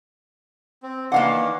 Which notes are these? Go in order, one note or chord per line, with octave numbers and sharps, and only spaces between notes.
C4
D#3 E3 A#3 D4 F5 F#5